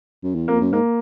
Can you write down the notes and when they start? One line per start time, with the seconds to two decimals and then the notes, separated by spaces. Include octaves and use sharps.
0.23 F#2
0.35 E2
0.48 F2 A#3
0.61 F#2
0.72 G#2 A#3